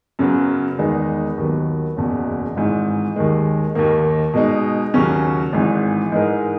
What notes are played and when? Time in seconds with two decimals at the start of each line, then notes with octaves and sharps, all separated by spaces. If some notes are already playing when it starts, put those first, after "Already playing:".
0.19 F#2 C#3 F#3 B3
0.78 E2 D#3 G#3 B3 D#4
1.38 D#2 D#3 F#3 B3
1.97 F#1 E2 B2
2.56 G#1 G#2 E3
3.16 D#2 D#3 G#3
3.75 D#2 D#3 A#3
4.34 B2 G#3 D#4
4.94 D#2 C#3 F#3 C#4
5.53 G#1 G#2 E3
6.12 G#2 E3 G#3 D#4 A#4